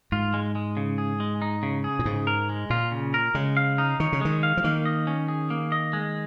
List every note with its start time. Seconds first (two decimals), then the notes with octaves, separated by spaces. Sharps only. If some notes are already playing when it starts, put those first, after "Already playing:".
0.12 G#2 F4
0.34 G#3
0.55 G#3
0.77 C#3
0.98 G#4
1.20 G#3
1.42 D#4
1.63 C#3
1.84 G#4
1.99 A#2
2.05 G#2 C#3
2.27 A#4
2.49 G#3
2.70 A#2 F4
2.92 C#3
3.14 A#4
3.35 C#3 G#3
3.57 F5
3.78 D#4
4.00 D#3 C#5
4.12 C#3
4.21 D#3 G#3
4.43 F5
4.57 F3
4.64 D#3 A#3
4.85 D#5
5.07 C#4
5.28 G#4
5.50 A#3
5.72 D#5
5.93 G#3